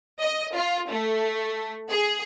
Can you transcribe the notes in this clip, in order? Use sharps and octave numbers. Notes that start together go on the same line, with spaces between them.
D#5
F4
A3
G#4